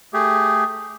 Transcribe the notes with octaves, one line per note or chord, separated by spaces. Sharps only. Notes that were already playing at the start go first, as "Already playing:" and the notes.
A3 G4 G#4